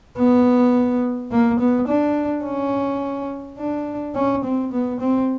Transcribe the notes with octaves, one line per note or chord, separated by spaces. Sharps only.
B3
A#3
B3
D4
C#4
D4
C#4
C4
B3
C4